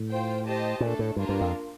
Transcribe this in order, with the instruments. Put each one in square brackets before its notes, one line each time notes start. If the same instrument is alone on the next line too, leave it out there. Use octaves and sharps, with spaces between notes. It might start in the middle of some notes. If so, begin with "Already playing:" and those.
Already playing: [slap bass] A2
[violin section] F4 C5 G5
G4 C5 D#5 A5
[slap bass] A#2 [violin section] A3 D4 A4
[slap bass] A2
[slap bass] G2 [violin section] A#3 D4 F4 A#4
[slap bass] G2
F2